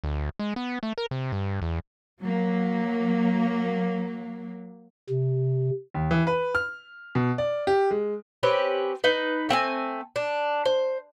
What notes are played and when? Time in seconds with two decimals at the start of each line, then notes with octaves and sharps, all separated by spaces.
0.04 D2
0.39 G#3
0.56 B3
0.83 A3
0.98 A#4
1.11 C3
1.32 G2
1.62 E2
2.20 F#3 A#3
5.10 C3
5.94 D#2
6.11 E3
6.27 B4
6.55 F6
7.15 B2
7.38 D5
7.67 G4
7.91 G#3
8.43 C4 C#4 G4 B4
9.04 D#4 B4
9.49 A3 C4 E5 G#5
10.16 D4
10.65 C5